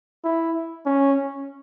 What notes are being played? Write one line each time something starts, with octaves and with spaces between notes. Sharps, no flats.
E4
C#4